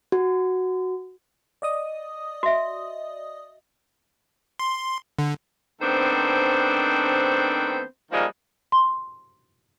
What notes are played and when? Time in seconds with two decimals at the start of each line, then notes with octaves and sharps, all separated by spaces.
0.12 F#4
1.62 D5 D#5 D#6
2.43 F#4 E5
4.59 C6
5.19 D3
5.81 D#3 A3 B3 C4 D4 C5
8.12 D#3 F3 G3 G#3 A#3
8.72 C6